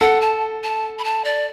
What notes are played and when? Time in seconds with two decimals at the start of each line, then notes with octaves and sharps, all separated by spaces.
0.01 A4 F#5
0.21 A5
0.63 A5
0.99 B5
1.04 A5
1.25 D5